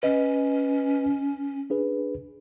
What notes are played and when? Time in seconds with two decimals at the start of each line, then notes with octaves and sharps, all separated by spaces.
0.03 C#4 B4 D#5
1.70 D4 G#4 B4